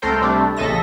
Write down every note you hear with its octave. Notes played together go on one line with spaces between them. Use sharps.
C#2 A3 A4 A#4 C5 G5
C3 G3 A3 D4
A#1 C#3 A4 D#5 E5 A#6